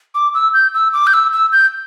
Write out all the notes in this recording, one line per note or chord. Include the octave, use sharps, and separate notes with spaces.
D6
E6
G6
E6
D6
G6
E6
E6
G6